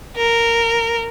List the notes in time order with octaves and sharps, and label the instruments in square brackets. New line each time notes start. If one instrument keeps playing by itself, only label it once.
[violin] A#4